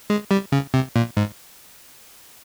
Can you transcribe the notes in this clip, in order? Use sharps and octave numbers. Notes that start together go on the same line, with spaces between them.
G#3
G3
C#3
C3
A#2
G#2